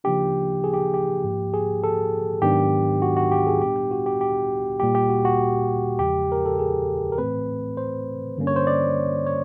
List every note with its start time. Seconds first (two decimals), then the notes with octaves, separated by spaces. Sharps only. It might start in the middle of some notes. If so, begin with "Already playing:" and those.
0.04 C#3 F3 A#3 D4 G4
0.64 G#4
0.74 G4
0.94 G4
1.24 G#2 F3 A#3
1.54 G#4
1.84 A4
2.42 G#2 D#3 F#3 B3 D4 G4
3.02 F#4
3.17 F#4
3.32 G4
3.47 G#4
3.61 A#2 G3 B3 D4 G4
3.76 G4
3.91 F#4
4.06 G4
4.21 G4
4.80 A#2 G3 A#3 G4
4.95 G4
5.10 F#4
5.25 F#4
5.99 E2 C#3 F3 G#3 G4
6.32 A#4
6.46 A4
6.59 G#4
7.12 A#4
7.18 A2 E3 A3 C4 B4
7.77 C5
8.37 G2 D3 G3 A#3 C#4
8.47 C#5
8.56 C5
8.67 D5
9.27 C#5